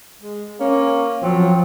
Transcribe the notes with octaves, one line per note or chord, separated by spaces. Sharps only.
G#3
A#3 C#4
F3 F#3 C4